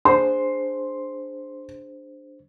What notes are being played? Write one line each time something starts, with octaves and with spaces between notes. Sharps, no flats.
D4 G#4 C5 C6